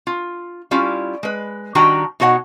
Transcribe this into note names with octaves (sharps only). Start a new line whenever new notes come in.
F4
G3 C#4 E4 F4
G#3 B4
D#3 G3 D4 F#4 G5 A#5
B2 D#4 F#4 C#5 D#5 F#5